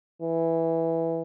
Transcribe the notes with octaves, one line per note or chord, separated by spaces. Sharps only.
E3